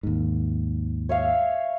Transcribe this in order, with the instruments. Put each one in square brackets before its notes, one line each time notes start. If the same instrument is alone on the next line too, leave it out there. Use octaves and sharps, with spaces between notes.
[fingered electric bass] D#2 G#2
[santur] C#5 E5 F5